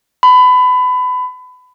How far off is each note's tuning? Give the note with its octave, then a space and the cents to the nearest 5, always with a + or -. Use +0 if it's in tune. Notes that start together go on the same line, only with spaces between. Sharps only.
B5 +25